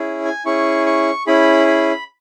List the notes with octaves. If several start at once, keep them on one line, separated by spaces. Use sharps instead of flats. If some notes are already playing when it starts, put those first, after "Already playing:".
Already playing: C#4 E4 G#4
G#5
C#4 E4 G#4 C#6
C#6
C#4 E4 G#4 B5
B5